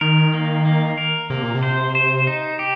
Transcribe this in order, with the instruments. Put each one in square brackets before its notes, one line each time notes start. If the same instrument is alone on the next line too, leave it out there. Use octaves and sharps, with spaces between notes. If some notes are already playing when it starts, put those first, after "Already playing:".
[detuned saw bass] D#3 [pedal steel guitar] A#4
[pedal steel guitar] A#3
A#3
A#4
[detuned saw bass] C3 [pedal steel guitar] A#3
[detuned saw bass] A#2
C3
[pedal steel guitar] C5
C5
D#4
G4